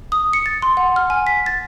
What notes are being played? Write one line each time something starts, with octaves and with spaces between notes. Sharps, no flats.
D#6
C#7
A6
C6
F#5
F6
G#5
B6
A6